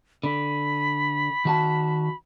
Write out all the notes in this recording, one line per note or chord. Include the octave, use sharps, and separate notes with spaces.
D3 B5
D#3 F#4 A5